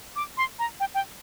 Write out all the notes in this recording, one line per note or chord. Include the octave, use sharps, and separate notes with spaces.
D6
C6
A#5
G5
G5